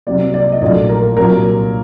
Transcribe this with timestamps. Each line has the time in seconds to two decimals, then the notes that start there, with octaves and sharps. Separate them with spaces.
0.07 C2 C3 F#3 A#3 D5
0.34 D5
0.52 D#5
0.61 A#1 A#2 F#3 A3 D5
0.89 A#4
1.17 C2 A#2 F#3 A#4